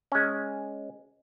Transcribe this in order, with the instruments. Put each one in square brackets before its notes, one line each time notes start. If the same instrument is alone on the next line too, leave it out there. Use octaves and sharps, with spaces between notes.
[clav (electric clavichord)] G#3 C#4